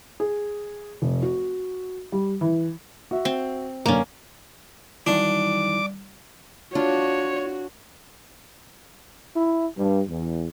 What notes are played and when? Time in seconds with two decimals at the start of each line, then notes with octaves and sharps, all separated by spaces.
0.20 G#4
1.02 F1
1.23 F#4
2.12 G3
2.41 E3
3.11 F#4 E5
3.25 C4
3.86 F#2 D3 A#3 C#4
5.06 F#2 D#3 E3 G3 D4 D6
6.75 D4 F4 F#4 C#5
9.36 E4
9.78 G2
10.09 E2